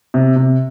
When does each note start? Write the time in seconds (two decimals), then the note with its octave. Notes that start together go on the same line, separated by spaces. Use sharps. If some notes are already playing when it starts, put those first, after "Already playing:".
0.14 C3
0.36 C3